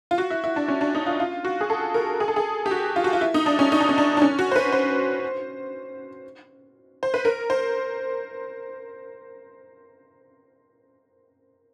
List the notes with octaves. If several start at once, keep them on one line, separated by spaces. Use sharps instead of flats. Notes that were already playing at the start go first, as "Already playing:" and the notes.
F4
F#4
E4
E4
D4
C#4
D4
D#4
F4
F4
F#4
G#4
A4
A#4
G#4
A4
G#4
G4
F#4
F4
F#4
F4
E4
D#4
D4
C#4
D#4
D4
C#4
D4
D4
C#4
F#4
C5
B4
C5
C5
B4
A#4
C5